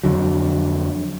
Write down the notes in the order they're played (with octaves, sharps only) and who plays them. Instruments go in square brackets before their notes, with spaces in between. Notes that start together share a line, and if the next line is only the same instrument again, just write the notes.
[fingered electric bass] F2 D3 F#3